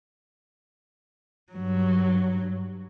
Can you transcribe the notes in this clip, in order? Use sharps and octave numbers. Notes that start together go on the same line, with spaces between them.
G2 F#3